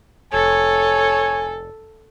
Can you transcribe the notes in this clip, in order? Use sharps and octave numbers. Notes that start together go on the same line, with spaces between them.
F1 A4 C#5 G#5